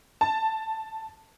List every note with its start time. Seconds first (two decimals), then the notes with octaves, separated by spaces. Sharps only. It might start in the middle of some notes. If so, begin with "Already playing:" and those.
0.21 A5